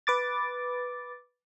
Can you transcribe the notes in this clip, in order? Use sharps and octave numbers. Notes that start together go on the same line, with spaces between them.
B4 D6 A6